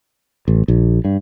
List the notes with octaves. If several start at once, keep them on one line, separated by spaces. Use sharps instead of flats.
A1
A#1
G2